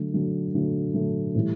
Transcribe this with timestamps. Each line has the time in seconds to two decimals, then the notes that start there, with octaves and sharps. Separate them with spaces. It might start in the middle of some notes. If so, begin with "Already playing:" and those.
Already playing: D3 F#3 A3
0.13 D3 F#3 A3
0.54 D3 F#3 A3
0.94 D3 F#3 A3
1.35 A2 E3 G3